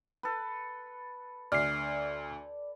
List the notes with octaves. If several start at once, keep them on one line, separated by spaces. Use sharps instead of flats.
A4 B4
D2 D5 F6 C7